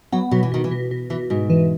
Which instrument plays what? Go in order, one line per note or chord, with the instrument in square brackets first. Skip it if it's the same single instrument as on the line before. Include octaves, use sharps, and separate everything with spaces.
[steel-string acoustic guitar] F#3 [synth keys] B3
[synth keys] B2 [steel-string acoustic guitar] F#3
[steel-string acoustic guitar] E3
[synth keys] B2 [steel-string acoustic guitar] D#3
[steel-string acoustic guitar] E3
[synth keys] B2
B2
[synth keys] B2 [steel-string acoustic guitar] E3
[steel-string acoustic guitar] G#2 [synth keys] B2
[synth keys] E3